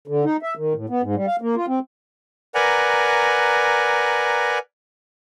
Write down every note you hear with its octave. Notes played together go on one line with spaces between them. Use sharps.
D3
D#4
E5
D#3
A2
B3
G#2
G3
F5
A#3
F4
C4
A#4 B4 D5 F#5 G#5 A#5